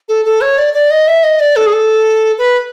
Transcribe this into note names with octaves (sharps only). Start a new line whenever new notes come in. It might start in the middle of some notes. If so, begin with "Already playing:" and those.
A4
A4
C#5
D5
D5
D#5
E5
D#5
D5
A4
G#4
A4
B4